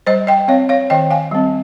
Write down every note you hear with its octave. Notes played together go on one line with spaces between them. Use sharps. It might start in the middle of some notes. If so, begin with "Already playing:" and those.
G3 C5 D#5
D#5 G5
C4 C#5 F5
C#5 F5
D#3 D#5 G5
F5 G#5
G3 C4